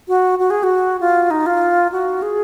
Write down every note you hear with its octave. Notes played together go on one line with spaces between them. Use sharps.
F#4
F#4
G#4
F#4
F4
D#4
F4
F#4
G#4